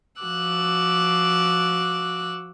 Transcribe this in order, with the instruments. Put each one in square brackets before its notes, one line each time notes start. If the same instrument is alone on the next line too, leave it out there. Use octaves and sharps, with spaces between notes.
[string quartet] F3 F#4 D6 E6 F#6